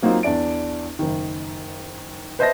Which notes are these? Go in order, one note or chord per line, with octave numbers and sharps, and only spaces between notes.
F#3 A#3 C4 D#4 F4
E2 D4 D5 D7
F#1 D#3
B4 C5 D#5 E5 A5 A#6